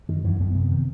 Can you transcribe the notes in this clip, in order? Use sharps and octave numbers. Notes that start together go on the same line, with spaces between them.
F#2 D#3
F#2 E3
F#2 B3
C3 B3
D#3